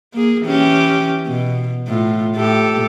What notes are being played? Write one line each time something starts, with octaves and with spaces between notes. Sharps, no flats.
A#3 G#4
E3 C#4 G4
B2
A2 F4
A2 G4 A4